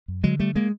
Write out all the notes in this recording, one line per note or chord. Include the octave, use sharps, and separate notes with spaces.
F#2
D3 F#3 G#3
D3 G3 A3
G#3 A#3